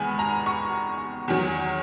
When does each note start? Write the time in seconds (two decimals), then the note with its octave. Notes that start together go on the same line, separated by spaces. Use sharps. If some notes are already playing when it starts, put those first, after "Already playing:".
Already playing: E2 D#3 G#3 B3 G#5 B5
0.19 A#5
0.46 C#6
1.28 E2 D#3 F#3